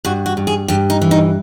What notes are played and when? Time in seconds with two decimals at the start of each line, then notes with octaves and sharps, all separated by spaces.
0.05 G2 F#4
0.26 F#4
0.37 G2
0.47 G#4
0.68 G2 G4
0.90 D#4
1.01 E3
1.11 D#4